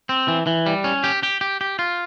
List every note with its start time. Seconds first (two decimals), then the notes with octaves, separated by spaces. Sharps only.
0.09 C4
0.28 E3
0.47 E3
0.66 G3
0.84 C#4
1.04 G4
1.23 G4
1.41 G4
1.61 G4
1.79 F4